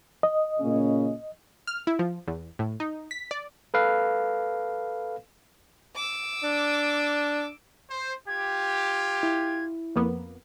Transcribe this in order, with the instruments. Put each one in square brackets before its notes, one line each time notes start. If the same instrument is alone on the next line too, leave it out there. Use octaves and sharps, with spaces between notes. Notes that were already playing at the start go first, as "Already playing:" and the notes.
[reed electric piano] D#5
[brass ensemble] A#2 C#3 C#4
[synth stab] F6
E4
F3
E2
A2
D#4
B6
D5
[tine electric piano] A4 B4 F5
[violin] D6 E6
[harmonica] D4
[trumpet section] C5
[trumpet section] F4 G4 [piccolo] G#6
[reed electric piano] E4
[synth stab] F2 A#3 B3